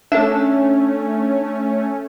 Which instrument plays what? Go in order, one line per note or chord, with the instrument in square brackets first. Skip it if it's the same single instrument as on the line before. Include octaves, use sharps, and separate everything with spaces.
[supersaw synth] A3 C#4 [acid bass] D4 [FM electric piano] A4 E5